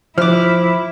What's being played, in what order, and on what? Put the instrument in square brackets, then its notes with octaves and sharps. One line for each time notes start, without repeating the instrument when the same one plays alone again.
[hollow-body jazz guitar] F3 [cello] E4 [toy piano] C5 [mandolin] D6 F6